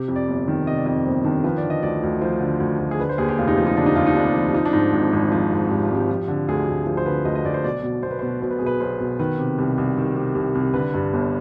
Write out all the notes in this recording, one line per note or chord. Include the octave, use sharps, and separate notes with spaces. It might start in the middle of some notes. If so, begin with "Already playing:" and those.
Already playing: C3 G4
F2
D5
G1
D#3
C3 D#5
D5
F2 D#5
D5
G1 C5
D#3 D4
F3 B4
D5
D3
D#5
D2 D5
D2
F3 C5
D3
D2
D2
G#4
D3 B4
C5
D#2 G#4
G4
F1 F4
D#4
F3
D#4
D3 D4
D#4
D#2 F4
D#4
F1 D4
F3
F3 D#4
D4
G#2 D#4
G#1
G#1
F3
G#2
G#1 G4
F4
G#1 G4
F3
D3
D2 G#4
D2
F3 G#4
C5
D3 B4
D2 D#5
D#5
D2 D5
C5
B1 D5
B2
B1 C5
B4
B2 C5
B1 C5
B4
B2 G#4
B4
B1 C5
B2
D#3 B4
C3
C2
C2
D#3
C3
C2
C2
D3 B4
G2
G1